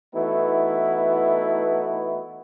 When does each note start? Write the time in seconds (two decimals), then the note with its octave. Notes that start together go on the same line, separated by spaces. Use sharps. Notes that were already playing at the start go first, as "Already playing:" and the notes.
0.14 E3 A3 B3 D#4 E4 F#4